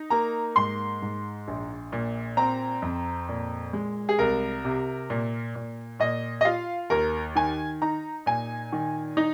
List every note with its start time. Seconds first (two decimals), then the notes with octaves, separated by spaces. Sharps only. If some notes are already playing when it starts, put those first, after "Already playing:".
Already playing: D#4
0.10 A#3 A#5
0.56 G#2 C6
1.02 G#2
1.48 A#1
1.92 A#2
2.37 C4 A#5
2.82 F2
3.29 A#2
3.73 G#3
4.09 G#4
4.19 C2 A#4
4.65 C3
5.10 A#2
5.55 A#2
6.00 A#2 D#5
6.41 D#5
6.45 F4 F5
6.90 D#2 A#4
7.35 D#3 G#5
7.82 D#4 A#5
8.26 A#2 G#5
8.72 D#3
9.17 D#4